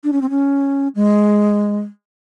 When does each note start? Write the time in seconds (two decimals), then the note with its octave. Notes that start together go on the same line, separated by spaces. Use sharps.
0.04 D4
0.13 C#4
0.22 C4
0.30 C#4
0.95 G#3